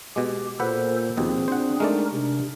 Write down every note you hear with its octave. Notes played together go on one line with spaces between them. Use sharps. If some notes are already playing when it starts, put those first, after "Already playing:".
B2 G#3 G4
A#2 A4 B4 C5 F#5
D#2 B2 F3 C4 G#4
D4 C5 F#5
G#3 A3 D#4 A#4 D5
C3 D4